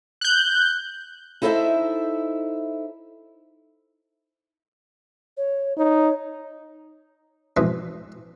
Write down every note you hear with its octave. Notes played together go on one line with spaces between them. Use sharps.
F#6 G6
D#4 E4 A4 C5 C#5 E5
C#5
D#4 C#5
F2 G#2 B2 E3 B4